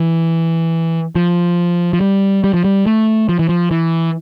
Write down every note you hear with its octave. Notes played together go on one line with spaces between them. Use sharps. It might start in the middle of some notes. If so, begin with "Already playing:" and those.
Already playing: E3
F3
F3
G3
G3
F3
G3
A3
F3
E3
F3
E3